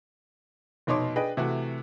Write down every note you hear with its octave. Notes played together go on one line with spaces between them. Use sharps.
F1 B2 D#4 C#5 C6 D6
D4 G#4 B4 D#5 G5
C3 E3 A3 F#4